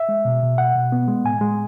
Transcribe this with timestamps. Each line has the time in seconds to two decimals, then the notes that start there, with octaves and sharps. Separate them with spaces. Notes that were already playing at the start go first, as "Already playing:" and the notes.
Already playing: E5
0.09 G#3
0.25 B2
0.42 B2
0.58 B2 F#5
0.76 B2
0.92 B3
1.08 G#3
1.24 A2 G#5
1.41 G#3